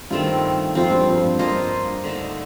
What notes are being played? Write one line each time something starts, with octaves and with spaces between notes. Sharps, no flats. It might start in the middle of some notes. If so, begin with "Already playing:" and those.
G2 D#3 A3 C4 F4
F2 C4 F4 C5
G2
F2
G2
G2 A#3 F4 C5 D#5
D3 A3 D#4